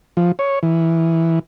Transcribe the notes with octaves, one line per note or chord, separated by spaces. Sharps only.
F3
C#5
E3